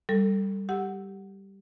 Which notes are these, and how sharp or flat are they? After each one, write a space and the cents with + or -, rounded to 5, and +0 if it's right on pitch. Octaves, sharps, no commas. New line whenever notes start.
G3 -5 A4 +20
G4 +0 F#5 +0 E6 +0